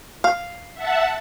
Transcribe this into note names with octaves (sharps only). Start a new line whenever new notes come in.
F5
E5 F#5 A5